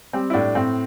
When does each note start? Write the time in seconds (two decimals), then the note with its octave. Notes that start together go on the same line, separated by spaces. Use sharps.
0.13 G3 C4
0.30 E4
0.34 A2 D4
0.55 A2 C4